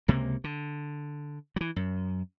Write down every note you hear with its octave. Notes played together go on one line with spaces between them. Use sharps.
C#2 C3 A#3
D3
E3 F#3
F#2